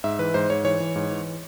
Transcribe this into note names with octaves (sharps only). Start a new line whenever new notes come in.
G#2 E5
E3 B4
G#2 C5
G#2 C#5
E3 C#5
E3
G#2
E3